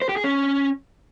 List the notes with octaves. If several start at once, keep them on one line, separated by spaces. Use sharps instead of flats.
C5
G4
G#4
C#4